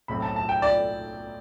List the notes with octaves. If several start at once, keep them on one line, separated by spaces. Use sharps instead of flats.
B1 A2 F#3 C4 B5
A5
A5
G5
D5